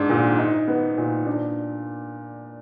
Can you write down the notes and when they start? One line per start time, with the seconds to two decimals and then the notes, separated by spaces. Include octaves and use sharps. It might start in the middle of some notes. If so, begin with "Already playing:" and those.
Already playing: G#2 D4
0.09 A#2
0.39 D#4
0.68 B3
0.98 A#2
1.27 D4